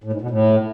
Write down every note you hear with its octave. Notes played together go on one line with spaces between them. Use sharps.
A2
G#2
B2
A2